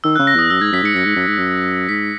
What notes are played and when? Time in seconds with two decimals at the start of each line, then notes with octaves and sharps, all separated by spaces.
0.04 D#3 E6
0.16 C#3 F#6
0.27 A#6
0.35 E2 D#6
0.50 F#2 E6
0.61 G#2 G#6
0.72 F#2 B6
0.83 G#2 C#7
0.94 F#2 A#6
1.05 G#2
1.16 F#2
1.27 G#2
1.38 F#2
1.89 G#2 B6